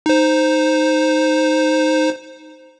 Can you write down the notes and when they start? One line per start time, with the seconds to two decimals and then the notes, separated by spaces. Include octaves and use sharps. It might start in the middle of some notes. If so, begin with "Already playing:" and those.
0.06 D#4 C5